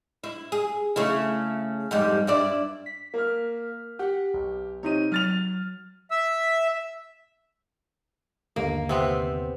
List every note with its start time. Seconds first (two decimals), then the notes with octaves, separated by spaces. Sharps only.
0.24 E4
0.52 G#4
0.96 C#3 A3 E4
1.91 F2 G#2 G3
2.27 G2 E4 D5
2.86 B6
3.14 A#3 F6
3.99 G4 F#5
4.34 B1
4.83 C3 D#4 C#5 D#7
5.12 F#3 F6 A6 F7
6.11 E5 E6
8.56 G1 D#2 A#3
8.89 C3 B3 C4